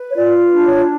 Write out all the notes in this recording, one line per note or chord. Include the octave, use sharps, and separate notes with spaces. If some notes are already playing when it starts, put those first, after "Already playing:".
Already playing: B4
C#5
F4 D5
D4
C#5